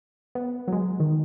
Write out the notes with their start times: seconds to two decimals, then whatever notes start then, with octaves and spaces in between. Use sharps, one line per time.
0.35 B3
0.68 F#3
0.73 G#3
1.00 D#3